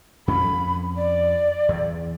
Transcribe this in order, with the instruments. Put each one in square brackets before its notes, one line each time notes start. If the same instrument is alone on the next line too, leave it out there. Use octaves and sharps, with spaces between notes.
[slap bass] F2 C#4 [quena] B5
[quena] D5
[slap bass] E2